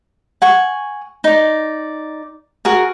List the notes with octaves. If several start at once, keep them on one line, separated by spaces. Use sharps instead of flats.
F#5 G#5 C#6
D#4 D5
F#4 G#4 A#4